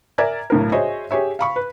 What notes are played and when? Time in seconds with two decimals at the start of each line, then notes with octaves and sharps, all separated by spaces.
0.18 A#4 D5 E5 G#5 A#5 G#6
0.50 B1 A2 A#4
0.72 F#4 G#4 C5 C#5 D#5 E5
1.11 G4 G#4 C#5 E5
1.39 F5 B5 C#6
1.56 B4